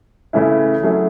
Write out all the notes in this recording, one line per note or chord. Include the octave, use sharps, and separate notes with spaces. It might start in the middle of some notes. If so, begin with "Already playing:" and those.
C#3 E3 A3 C#4 E4
F#3 A3 C#4 E4 G#4